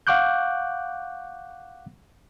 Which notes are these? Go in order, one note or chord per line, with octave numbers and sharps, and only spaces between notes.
F5 F#5 C#6 D6 F#6 G6